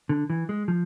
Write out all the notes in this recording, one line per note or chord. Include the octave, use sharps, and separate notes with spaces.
D3
E3
G#3
F3